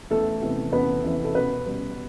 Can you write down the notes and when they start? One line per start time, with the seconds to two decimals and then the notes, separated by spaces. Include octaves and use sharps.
0.10 E2 A3 A4
0.42 C3 E3 B3
0.72 E2 B3 B4
1.04 C3 E3 B3
1.24 A4
1.34 B2 B3 B4
1.66 G3 B3